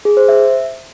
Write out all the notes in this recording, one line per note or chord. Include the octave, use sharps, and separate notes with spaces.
G#4
C5
E5